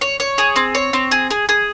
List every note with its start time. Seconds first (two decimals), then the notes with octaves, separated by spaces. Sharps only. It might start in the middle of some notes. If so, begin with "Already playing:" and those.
0.01 C#5
0.20 C#5
0.38 G#4
0.56 C4
0.75 C#5
0.93 C4
1.11 G#4
1.30 G#4
1.49 G#4